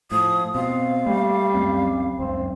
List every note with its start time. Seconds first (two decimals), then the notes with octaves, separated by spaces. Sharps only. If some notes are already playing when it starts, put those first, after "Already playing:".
0.12 A2 F3 D#6
0.55 B2 C4 F5
1.06 G3 A3 A#3
1.54 C#2 F#2 C4
2.19 C#2 F#2 C4